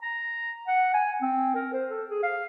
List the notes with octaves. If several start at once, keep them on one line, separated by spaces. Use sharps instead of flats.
A#5
F#5
G#5
C4
A#4
C5
A4
G#4
F5